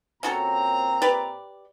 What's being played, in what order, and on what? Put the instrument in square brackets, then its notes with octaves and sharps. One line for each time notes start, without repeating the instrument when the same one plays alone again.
[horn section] A#2 C4 A#5 [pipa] C#4 F#4 A4
[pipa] G4 B4 D5